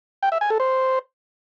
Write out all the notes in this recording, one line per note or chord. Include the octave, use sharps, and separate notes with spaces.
G5
E5
G#5
A4
C5